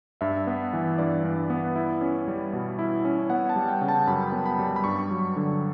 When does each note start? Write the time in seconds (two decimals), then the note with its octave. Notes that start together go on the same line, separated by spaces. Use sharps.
0.21 G2 E5
0.47 B3
0.73 E3
0.98 G2 D5
1.24 G2
1.50 B3
1.76 E4
2.01 C#4
2.28 G3
2.53 B2
2.79 E4
3.05 C#4
3.30 B3 F#5
3.49 A5
3.56 G3
3.68 G5
3.82 C#3
3.88 A5
4.07 F#2 B5
4.32 B3
4.46 B5
4.59 G3
4.76 B5
4.84 G2 C#6
5.11 F#3
5.36 D3